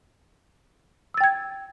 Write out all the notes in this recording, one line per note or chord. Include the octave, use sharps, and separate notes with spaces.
G5 E6 G#6 A6